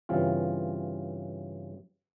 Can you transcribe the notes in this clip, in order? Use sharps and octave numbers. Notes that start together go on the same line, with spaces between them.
G2 C#3 E3 C4 F4